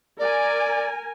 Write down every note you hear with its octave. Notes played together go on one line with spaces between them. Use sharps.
A#4 D5 G#5